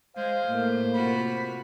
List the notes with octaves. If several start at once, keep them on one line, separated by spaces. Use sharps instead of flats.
G#3 C5 F5
A2 A#3
C3 F4 F#4 B5